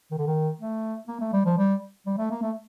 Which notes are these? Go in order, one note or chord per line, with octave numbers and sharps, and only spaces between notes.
D#3
D3
D#3
A3
A#3
A3
G3
F3
G3
G3
A3
A#3
A3